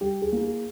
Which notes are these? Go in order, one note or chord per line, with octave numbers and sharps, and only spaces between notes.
G3 G4
G#4
A#3 E4
G#4